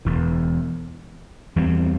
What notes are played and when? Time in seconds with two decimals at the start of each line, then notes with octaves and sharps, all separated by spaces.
0.05 E1 E2 E3
1.56 E2 E3 G3 C4